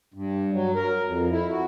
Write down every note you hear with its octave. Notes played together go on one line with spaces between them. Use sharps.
G2
F#3
A#4
F2
E4
F#4